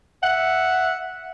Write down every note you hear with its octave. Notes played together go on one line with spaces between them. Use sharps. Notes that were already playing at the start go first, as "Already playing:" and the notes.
E5 F#5